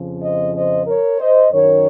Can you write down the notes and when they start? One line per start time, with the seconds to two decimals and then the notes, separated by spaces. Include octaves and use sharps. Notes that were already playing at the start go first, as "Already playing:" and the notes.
Already playing: F2 C#3 F3
0.22 C5 D#5
0.55 C5 D#5
0.86 A#4 C#5
1.19 C5 D#5
1.51 F#2 D#3 A#4 C#5